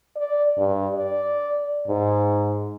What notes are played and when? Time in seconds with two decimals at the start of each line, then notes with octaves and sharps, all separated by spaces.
0.16 D5
0.58 G2
0.95 D5
1.88 G#2